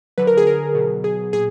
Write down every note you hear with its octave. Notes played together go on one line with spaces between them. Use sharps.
D3 F#3 B4
A#4
G#4
A#4
B2 F#3
G#4
A#2 G#4